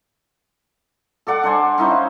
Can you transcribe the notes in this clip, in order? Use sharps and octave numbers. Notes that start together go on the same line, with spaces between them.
A4 D5 F#5 D6
D4 C5 G#5
C#4 D#4 E4 C5
F5